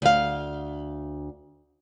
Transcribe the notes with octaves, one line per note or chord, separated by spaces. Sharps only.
D2 F5